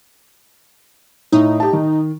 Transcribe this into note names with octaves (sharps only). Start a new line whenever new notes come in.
A2 D#4
G4 A5
D#3